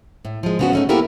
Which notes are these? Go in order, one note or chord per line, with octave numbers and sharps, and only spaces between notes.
A2
F3 G#3
C#3 F3 B3 C#4 F#4
A3 C#4 D#4
A#3 B3 E4 G4 A4 A#4